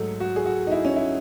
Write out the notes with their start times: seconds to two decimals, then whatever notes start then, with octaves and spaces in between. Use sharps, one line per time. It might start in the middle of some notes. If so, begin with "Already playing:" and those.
Already playing: G#2 F#3 A3 A4
0.20 F#4
0.36 G#4
0.46 F#4
0.67 D#4
0.71 E4
0.85 C#4
0.96 E4